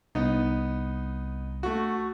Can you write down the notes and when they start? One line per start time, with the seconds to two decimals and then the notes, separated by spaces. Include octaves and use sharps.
0.15 C2 B3 D#4
1.63 A3 F#4